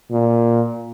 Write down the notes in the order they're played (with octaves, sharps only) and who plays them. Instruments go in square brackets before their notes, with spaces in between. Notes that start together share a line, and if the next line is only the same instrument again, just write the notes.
[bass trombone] A#2